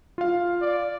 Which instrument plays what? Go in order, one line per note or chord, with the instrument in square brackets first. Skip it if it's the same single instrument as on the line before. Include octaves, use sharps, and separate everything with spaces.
[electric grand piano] F4 F5
[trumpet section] D5